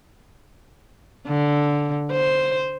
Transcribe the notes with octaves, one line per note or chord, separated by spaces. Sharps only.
D3
C5